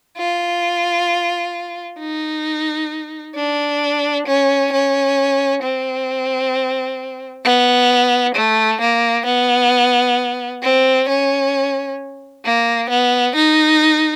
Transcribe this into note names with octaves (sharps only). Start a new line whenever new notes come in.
F4
D#4
D4
C#4
C#4
C4
B3
A3
A#3
B3
C4
C#4
A#3
B3
D#4